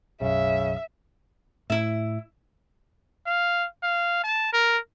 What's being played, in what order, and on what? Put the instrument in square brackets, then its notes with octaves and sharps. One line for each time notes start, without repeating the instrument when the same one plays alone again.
[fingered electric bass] B1 F#2 [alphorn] C#3 [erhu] E5
[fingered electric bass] A2 [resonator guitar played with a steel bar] E4 E5
[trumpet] F5
F5
A5
A#4